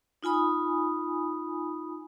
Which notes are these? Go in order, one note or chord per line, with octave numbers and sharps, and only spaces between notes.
D#4 F4 G#5 B5 D#6